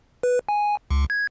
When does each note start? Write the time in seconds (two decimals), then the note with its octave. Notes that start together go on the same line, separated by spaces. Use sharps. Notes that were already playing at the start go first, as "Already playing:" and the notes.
0.23 B4
0.49 G#5
0.90 C#2
1.10 G#6